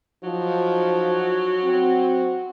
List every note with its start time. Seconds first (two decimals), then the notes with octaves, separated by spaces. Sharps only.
0.23 F3 F#3 D#4
1.63 C4 F#4